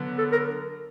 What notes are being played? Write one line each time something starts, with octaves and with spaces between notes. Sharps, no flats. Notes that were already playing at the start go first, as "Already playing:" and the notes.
Already playing: D3 F#3 B3
A4
A#4